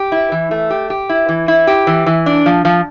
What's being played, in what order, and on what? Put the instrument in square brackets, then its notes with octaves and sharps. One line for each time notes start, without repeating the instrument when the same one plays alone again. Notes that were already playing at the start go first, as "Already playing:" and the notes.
Already playing: [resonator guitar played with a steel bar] G4
E4
E3
A3
G4
G4
E4
E3
E4
G4
E3
E3
D4
F3
F3